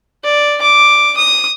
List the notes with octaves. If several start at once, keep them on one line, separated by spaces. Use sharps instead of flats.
D5
D6
D#6